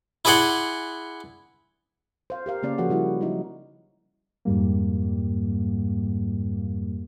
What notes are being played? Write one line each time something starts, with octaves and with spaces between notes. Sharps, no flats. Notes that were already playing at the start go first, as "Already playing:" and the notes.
E4 G#4 D5 F#5 C6
C5 F5
G4 A#4 F5
C#3 A#3 C#4 D5
F3 F#4 G#4 F#5
C#3 G3 E4 F#4
F#3 G3 D#4 E4
F2 G#2 G3 A#3